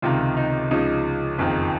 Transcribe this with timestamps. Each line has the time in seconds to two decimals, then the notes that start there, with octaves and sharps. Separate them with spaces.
0.02 C#2 C3 D#3 F4
0.37 D#4
0.71 C#2 C#3 F3 D#4
1.38 F#1 F2 D#3